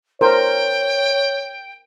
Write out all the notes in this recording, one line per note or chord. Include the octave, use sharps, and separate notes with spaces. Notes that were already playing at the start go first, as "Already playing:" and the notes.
A#4 C5 C#5 G5